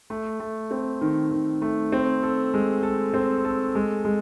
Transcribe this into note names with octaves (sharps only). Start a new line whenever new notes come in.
A3
A3
C4
D#3
D#3
A3
C4
A4
G#3
A4
C4
A4
G#3
G#3